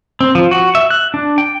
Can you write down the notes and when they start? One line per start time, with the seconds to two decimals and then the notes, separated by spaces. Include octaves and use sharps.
0.21 C4
0.35 F3
0.51 F#4
0.75 E5
0.90 F#6
1.14 D4
1.38 G5